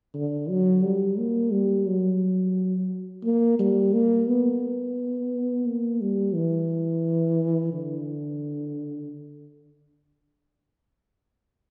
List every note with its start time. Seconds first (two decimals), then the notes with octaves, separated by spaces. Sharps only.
0.14 D3
0.49 F#3
0.83 G3
1.18 A#3
1.52 G3
1.87 F#3
3.24 A#3
3.59 G3
3.93 A#3
4.28 B3
5.66 A#3
6.01 G3
6.34 E3
7.72 D3